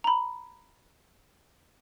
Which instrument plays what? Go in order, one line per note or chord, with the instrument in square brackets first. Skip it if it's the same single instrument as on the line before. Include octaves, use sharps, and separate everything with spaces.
[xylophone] A#5 B5